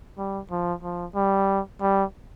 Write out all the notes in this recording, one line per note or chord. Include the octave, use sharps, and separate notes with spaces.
G3
F3
F3
G3
G3